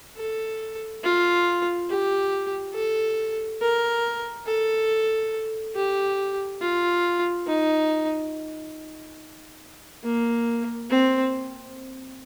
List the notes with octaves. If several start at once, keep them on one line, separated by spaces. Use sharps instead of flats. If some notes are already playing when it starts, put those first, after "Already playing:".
A4
F4
G4
A4
A#4
A4
G4
F4
D#4
A#3
C4